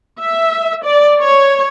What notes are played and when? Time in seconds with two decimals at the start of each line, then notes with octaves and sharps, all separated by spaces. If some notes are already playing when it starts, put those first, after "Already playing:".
0.21 E5
0.84 D5
1.20 C#5